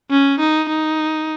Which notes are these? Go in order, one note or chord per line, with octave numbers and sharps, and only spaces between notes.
C#4
D#4
D#4